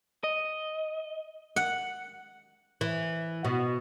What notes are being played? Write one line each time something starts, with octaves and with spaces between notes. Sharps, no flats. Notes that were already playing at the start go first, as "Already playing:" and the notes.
D#5
F#5
E3
B2